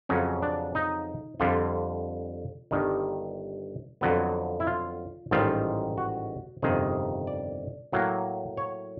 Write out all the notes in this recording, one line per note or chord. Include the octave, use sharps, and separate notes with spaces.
F2 C#3 F#3 C#4
D4
D#4
F2 D3 G3 F4
G1 G2 D#3
F2 D3 F#3 B3
E4
F4
A1 G#2 D#3 G3 F4
F#4
G1 F2 C3 D#3 G#4
D5
A2 F#3 A#3
C#5